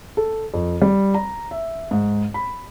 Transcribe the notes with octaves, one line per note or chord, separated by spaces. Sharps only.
A4
F2
G3
A#5
E5
G#2
B5